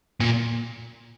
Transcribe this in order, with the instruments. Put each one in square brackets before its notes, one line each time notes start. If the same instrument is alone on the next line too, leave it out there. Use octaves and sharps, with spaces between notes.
[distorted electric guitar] A#2